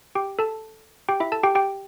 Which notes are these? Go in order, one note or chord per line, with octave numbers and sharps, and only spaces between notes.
G4 G5
A4 A5
G4 G5
E4 E5
A4 A5
G4 G5
G4 G5